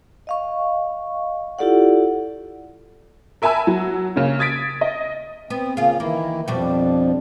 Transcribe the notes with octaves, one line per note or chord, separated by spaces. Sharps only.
D#5 F5 C#6
E4 F4 G4 A4 D5 F#5
A#4 E5 G#5 A5 B5 E6
F#3
C#3 A#3 C#4
D#6 G#6 A6 B6 D7
D#5
B3 C4
C#3 A#3 F4 G#4 F5
D#3 E3 A#3 E4
F2 B2 F3 G3 D4